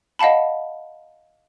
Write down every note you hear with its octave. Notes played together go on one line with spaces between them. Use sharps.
D#5 F5 F#5 A5 B5